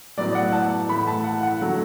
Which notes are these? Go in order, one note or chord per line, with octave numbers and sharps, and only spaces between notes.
A2 F#3 B3 D5
F#5
A5
A2 E3 A3 B5
A5
F#5
F#5
D3 F#3 A3